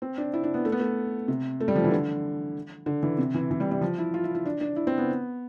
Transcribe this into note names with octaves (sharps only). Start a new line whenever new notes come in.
C4
D4
E4
D4
B3
A3
B3
A3
C3
A3
G3
F3
E3
D3
D3
E3
C3
E3
E3
G3
G3
F3
E4
F4
E4
E4
D4
D4
E4
C4
B3